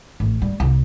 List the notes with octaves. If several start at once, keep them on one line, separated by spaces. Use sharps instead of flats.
A1
G3
C2